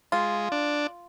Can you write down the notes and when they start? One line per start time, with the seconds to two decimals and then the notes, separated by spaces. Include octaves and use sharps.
0.12 G#3 F4
0.52 D4